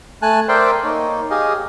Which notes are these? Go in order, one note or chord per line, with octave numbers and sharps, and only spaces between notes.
A3 G#5 A5 F#6
A#4 C5 D5 E5 G5 C6
A#3 D#4 C#5
G4 G#4 D#5 F5